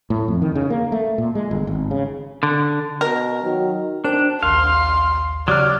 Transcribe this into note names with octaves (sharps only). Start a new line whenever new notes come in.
A2
F2
D#3
C#3
A#3
A3
A#2
G#3
G1
G#1
C#3
D3
B2 A#4
D#3 F#3
D4 A#4 C5 G5
A#1 D#2 F5 C6
C#3 F#3 G4 D5 F6